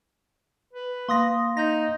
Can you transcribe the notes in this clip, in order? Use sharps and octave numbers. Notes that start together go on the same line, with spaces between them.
B4
A#3 F5 C6 D#6 A#6
D#4 G6 A#6